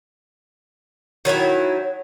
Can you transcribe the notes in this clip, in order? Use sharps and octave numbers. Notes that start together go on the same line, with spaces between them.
D#3 F#3 E4 G#5